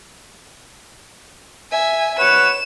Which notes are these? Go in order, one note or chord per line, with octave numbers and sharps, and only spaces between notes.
E5 G#5
B4 C#5 F#5 E7